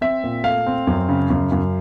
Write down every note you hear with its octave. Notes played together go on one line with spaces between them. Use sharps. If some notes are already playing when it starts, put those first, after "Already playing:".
C4 E5
A#2
A3 F5
C4
F#2
C#3
F#2
F#2